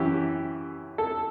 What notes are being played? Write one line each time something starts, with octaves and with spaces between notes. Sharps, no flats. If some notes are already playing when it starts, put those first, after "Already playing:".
Already playing: F#2 E3 G4
A4